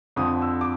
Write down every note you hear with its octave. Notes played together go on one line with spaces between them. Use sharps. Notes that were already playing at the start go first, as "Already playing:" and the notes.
F2 D3 F3 D#6
E6
D6